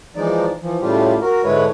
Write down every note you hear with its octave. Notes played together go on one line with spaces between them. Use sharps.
E3 F3 G#3 D#4 D5
E3 F3
A2 C#3 G3 A3 F4 G4
F#4 A#4
G#2 D3 G#3 E4 B4 C#5